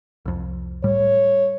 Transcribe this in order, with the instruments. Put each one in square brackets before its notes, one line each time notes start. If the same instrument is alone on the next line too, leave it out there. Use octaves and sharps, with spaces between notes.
[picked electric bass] C2 F2
[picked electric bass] A2 G3 [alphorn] C#5